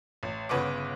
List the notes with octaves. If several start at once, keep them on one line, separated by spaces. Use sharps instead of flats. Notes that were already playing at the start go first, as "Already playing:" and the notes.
A1
G1 C#3 B4 C#5 F#5 D6